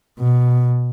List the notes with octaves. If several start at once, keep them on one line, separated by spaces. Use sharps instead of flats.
B2